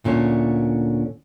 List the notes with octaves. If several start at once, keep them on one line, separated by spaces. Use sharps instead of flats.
D2 A#2 D3 C#4 C#5